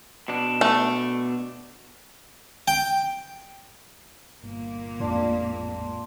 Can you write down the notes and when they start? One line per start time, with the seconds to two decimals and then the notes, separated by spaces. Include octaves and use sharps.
0.28 B2 D4
0.61 A3
2.68 G5
4.43 G1 A#2 A#3
5.00 A1 F2 A2 G#3 D4 F4